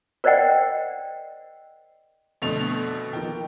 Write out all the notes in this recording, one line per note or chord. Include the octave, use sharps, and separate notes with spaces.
A#4 C5 D5 D#5 F#5 G5
F2 B2 D3 A3 F7
D#3 F3 A#3 G5